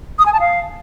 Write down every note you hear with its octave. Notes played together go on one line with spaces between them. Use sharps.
D#6
G#5
A5
F5